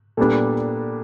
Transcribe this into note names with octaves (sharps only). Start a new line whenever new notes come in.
A#2 G3 B3 D4 A4